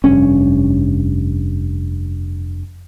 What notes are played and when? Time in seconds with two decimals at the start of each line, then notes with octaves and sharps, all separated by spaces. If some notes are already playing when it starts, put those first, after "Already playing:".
0.04 F1 G2 C#4